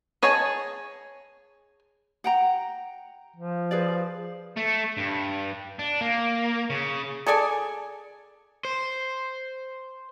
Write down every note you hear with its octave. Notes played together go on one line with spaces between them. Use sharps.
G#4 C#5 D#5 G#5 A5
F#5 G5 A#5
F3
G#4 B4 D5
A3
G2
D4
A#3
C#3
G#4 A4 D5 G#5
C5